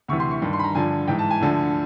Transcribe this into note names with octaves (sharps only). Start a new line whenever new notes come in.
D2 C3 E3 C#6
C6
C#6
G2 D#3
C6
B5
A#5
G2 D3 F3 G#5
G#2 E3 G5
A5
G#5
D2 D3 F3